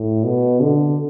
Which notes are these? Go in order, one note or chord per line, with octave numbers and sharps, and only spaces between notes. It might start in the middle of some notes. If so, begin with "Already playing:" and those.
Already playing: A2
B2
D3